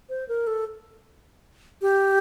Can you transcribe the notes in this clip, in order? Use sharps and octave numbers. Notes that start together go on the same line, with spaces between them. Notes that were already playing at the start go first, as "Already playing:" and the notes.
C5
A#4
A4
G4